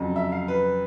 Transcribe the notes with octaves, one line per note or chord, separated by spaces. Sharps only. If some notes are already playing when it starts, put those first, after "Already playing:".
Already playing: F2 C#3 F#3
E5
F5
B4